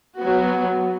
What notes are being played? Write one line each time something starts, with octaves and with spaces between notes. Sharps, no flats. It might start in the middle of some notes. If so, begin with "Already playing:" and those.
F#3 B3 F#4